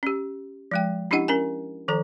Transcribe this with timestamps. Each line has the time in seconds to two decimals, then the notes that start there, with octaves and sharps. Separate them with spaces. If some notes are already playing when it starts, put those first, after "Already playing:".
0.03 C#4 G4
0.71 F3 G#3 G5
1.11 C#4 D4 E4 G4 D#5 F#5
1.28 C#4 A#4 G#5
1.88 D#3 F3 A4 A#5